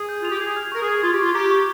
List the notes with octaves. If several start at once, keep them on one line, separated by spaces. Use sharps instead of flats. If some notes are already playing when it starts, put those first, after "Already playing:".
Already playing: G#4
G6
F4 F7
G4
G#4 G#6
F6
A#4 C#6
G#4
G#6
F4 G#6
G4
F4 C#6
G4 A#5
C#6